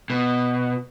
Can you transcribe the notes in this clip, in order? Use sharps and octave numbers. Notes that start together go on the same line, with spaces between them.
B2